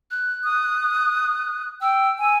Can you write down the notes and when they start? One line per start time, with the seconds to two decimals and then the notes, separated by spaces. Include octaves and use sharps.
0.11 F#6
0.44 D#6
1.82 G5 E6
2.19 G#5